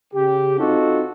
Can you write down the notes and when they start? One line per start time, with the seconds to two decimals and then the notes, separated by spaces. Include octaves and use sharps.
0.13 C#3 G4
0.59 C4 D#4 F4 F#4 A4